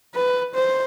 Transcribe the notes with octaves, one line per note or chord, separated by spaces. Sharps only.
B4
C5